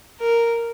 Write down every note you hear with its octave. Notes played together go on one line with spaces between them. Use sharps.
A#4